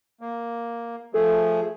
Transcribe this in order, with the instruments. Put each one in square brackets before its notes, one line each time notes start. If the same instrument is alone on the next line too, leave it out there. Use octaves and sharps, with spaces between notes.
[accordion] A#3
[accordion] F3 A3 G#4 [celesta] A4